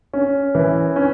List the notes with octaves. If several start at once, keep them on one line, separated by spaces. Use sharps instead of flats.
C#4
E3
C#4